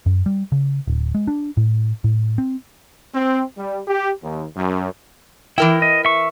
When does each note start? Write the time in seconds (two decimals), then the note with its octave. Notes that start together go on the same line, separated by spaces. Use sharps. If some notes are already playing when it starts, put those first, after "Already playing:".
0.06 F#2
0.26 G3
0.52 C#3
0.87 D1
1.15 G#3
1.28 D4
1.57 A2
2.04 A2
2.38 C4
3.15 C4
3.58 G3
3.88 G4
4.23 D#2
4.56 F#2
5.58 E3 E4 A#4 G5
5.82 D#5
6.05 E5 C#6